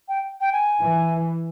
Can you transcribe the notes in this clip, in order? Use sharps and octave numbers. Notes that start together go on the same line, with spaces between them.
G5
G5
G#5
E3